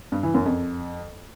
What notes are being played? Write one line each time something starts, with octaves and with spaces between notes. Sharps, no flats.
G2
E3
F#2
F2